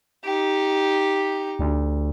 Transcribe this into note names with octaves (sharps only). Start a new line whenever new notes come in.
D#4 G4
D2